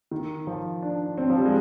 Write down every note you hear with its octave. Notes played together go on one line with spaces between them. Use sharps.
D#3
F3
D4
C4
F3
G3
G#3